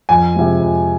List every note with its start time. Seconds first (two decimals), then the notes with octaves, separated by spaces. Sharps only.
0.09 F2 G#5
0.35 C3 F3 G#3
0.61 F2